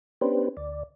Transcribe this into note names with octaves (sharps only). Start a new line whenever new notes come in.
B3 C#4 D4 G4 B4 C5
D2 D5